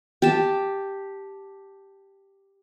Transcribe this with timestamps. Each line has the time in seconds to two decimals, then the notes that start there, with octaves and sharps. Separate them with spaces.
0.22 G4 A5